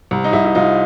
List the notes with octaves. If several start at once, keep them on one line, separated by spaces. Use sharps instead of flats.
C2
D#4
C2 E4
E4
C2 D#4 F4